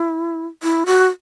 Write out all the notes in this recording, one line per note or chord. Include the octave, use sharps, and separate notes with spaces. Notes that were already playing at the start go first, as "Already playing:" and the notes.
Already playing: E4
E4
F#4